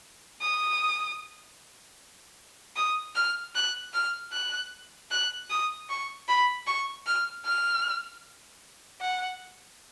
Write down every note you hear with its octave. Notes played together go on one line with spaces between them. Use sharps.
D#6
D#6
F6
F#6
F6
F#6
F#6
D#6
C#6
B5
C#6
F6
F6
F#5